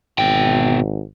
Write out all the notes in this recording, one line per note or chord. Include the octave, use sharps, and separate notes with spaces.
G#1 B2 G5